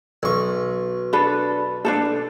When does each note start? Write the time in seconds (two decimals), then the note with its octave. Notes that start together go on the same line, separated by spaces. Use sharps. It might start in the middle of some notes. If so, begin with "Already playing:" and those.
0.23 B1 C#6
1.13 D4 A4 B4
1.85 D4 D#4 A4